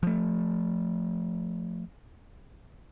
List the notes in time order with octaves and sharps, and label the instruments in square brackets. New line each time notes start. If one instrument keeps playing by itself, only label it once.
[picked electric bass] F3 A3